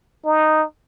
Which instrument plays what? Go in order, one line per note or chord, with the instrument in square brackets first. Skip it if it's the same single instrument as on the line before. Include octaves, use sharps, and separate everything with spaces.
[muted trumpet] D#4